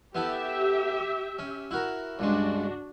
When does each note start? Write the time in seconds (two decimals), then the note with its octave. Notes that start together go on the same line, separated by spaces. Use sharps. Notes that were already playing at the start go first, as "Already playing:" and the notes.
0.15 B3 E4 G4 A4 E5
1.39 C#4
1.71 E4 F#4 A#4
2.19 C#2 G2 G#3 D4 F#4